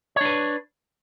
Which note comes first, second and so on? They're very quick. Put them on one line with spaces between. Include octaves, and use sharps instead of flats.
C#5 D4 B4